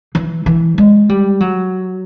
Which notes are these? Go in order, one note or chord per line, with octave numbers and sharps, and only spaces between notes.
E3
E3
G#3
G3
F#3